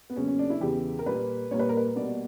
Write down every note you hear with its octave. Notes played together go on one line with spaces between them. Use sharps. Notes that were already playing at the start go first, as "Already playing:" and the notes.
B3
E2 C#3 F#3 A#3 C#4
C#4
D4
E4
E2 C#3 E3 G4
A#4
A#2 G3 A#3 B4
A#2 G3 A#3 C#5
B4
A#4
B4
B2 G3 A#3 D5